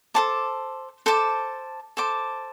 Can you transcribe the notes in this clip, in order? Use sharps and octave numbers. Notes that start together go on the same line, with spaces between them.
A4 C5 A5 D6
A4 C5 A5 D6
A4 C5 A5 D6